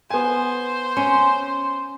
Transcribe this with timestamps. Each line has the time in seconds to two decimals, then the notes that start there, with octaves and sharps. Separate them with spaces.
0.10 B3 C5 G#5
0.97 C#4 C6